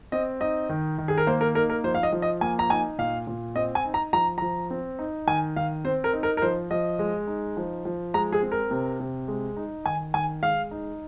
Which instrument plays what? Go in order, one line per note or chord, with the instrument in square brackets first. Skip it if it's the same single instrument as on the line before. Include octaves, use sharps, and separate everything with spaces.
[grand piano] C4 D#5
D#4 D#5
D#3
D#3
G#4
A#4
A#3 C5
A#4
D#4 A#4
A#4
F3 C5
F5
D#5
F3
D#5
A#3 G#5
A#5
D#4 G#5
A#2 F5
A#2
C4 D#5
G#5
D#4
A#5
F3 A#5
F3 A#5
C4
D#4
D#3 G#5
D#3 F5
C4 C5
A#4
D#4
A#4
A#4
F3 C5
F3 D#5
G#3
D#4
F3
F3
G#3 A#5
G#4
C4
A#4
C3
C3
G#3
D#4
D#3 G#5
D#3 G#5
G#3 F5
D#4